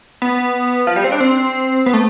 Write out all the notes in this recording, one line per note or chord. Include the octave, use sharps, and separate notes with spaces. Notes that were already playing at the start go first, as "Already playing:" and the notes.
B3
F3
G3
C4
D4
C4
B3
A3